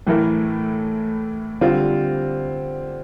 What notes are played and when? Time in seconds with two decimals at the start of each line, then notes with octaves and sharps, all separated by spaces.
0.07 A2 E3 A3 E4 A#4
1.61 D3 G3 C4 F4